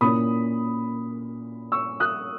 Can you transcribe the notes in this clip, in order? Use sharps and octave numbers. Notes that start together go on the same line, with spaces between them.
A#2 A#3 C#4 E4 B5 D#6
C#6 E6
D#6 F#6